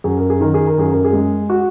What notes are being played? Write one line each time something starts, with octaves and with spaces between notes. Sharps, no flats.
F#2 G#4
A#4
G#4
D#3 A#4
G#4
A#4
F#2 G#4
A#4
G#4
G#3
F#4